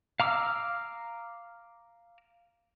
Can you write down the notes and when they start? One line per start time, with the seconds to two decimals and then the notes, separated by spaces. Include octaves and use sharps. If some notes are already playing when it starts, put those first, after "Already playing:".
0.20 F5 A#5 D6 E6 F6